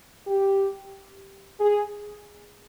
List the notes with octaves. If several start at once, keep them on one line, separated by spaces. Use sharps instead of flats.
G4
G#4